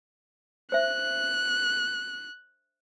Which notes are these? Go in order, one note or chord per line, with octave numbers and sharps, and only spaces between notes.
C5 E5 F#6